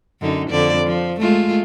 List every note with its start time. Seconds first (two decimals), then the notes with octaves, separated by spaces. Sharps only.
0.21 F#2 D3 D#4
0.50 F2 D3 D5
0.86 F3
1.20 G#3 A3 F4